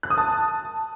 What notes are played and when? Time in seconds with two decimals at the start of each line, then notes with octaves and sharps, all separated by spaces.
0.03 F#6
0.10 D#6
0.18 A5